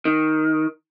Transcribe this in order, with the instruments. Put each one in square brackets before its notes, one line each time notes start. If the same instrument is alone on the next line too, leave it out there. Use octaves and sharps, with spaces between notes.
[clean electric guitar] D#3